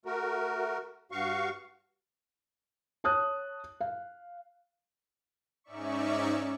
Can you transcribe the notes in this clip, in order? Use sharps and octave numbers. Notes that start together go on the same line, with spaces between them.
A3 F#4 A#4
G2 F#4 F5 C#6
C#5 A5 D#6 F#6
F5
G#2 C#4 D#4 D5 E5 C#6